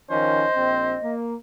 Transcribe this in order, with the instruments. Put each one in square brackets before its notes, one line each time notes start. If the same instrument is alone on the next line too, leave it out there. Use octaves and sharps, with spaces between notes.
[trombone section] D#3 F3 C#4 [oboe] C5 [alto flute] D#5
[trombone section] A#1 C4
A#3